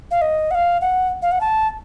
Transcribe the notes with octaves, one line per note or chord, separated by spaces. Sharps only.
F5
D#5
F#5
F5
F#5
F5
F#5
A5